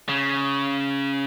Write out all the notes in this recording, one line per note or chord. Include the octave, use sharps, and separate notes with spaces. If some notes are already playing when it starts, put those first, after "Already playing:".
C#3